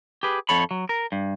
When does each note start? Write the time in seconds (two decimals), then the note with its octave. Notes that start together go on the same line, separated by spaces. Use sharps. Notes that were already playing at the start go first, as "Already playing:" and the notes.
0.23 G4 G#4 B4
0.49 F2 A4 C#5 B5
0.71 F#3
0.89 A#4
1.12 G2